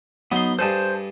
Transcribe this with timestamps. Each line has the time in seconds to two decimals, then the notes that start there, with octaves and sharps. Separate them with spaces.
0.32 F#3 B3 D#4 C6
0.59 G2 G#4 A4 C5 A5